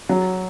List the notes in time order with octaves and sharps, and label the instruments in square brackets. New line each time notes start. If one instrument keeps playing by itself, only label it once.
[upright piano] F#3